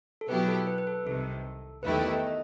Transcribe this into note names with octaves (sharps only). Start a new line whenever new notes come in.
A4
B2 F#3 B3 E4 G4 B4
A4
B4
B4
A4
C2 C3 D#3 A4
E2 D#3 A3 E4 G4 B4
D#5
D#5